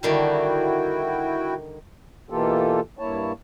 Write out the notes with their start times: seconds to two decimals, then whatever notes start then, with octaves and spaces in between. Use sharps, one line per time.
0.03 D3 D#3 G3 E4 F#4 G5
2.30 B2 E3 A#3 F4 G4 A4
2.99 G2 A#3 E4 C#5 A5